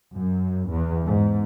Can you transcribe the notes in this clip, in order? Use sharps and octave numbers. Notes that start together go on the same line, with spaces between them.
F#2
E2
G#2